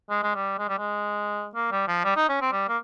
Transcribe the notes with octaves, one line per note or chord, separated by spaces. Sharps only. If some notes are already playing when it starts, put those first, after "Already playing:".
G#3
G#3
G3
G#3
G3
G#3
A#3
G3
F3
G3
D#4
C#4
C4
G3
A#3